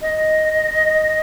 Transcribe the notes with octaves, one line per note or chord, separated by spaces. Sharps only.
D#5